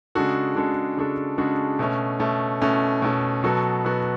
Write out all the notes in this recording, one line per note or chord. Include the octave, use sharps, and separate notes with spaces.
C#3 G#3 D4 F#4 A4
C#3 G#3 D4 F#4 A4
C#3 G#3 D4 F#4 A4
C#3 G#3 D4 F#4 A4
B2 A3 C#4
B2 A3 C#4
B2 A3 C#4
B2 A3 C#4
B2 F#3 B3 F#4 A4
B2 F#3 B3 F#4 A4